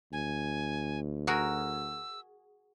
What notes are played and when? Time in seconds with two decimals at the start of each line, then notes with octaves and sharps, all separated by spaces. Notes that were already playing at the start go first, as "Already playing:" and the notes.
0.13 D2 G#5
1.27 F#4 G#4 A#4 E6